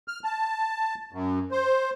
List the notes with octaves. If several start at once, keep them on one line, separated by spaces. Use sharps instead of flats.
F6
A5
F#2
C5